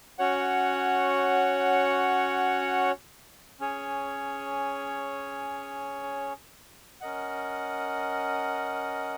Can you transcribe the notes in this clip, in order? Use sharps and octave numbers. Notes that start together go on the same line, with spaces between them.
C#4 F#4 C#5 F#5
C#4 G#4 C#5
C#4 A#4 D#5 F#5